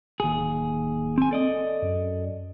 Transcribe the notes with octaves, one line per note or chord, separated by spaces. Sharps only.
D1 D#2 G#4
C4 G#5
A4 D5 D#5
F#2